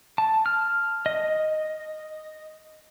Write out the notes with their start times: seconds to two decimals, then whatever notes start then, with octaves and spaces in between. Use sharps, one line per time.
0.18 A5
0.46 F6
1.06 D#5